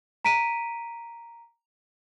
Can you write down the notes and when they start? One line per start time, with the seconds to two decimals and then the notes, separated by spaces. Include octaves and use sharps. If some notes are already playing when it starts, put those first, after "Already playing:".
0.25 A#5 B6 D7 D#7